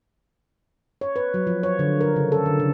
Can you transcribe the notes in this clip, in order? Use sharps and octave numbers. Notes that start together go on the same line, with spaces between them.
C#5
B4
F#3
F3
C#5
D3
A#4
C#3
A4
D3
C#3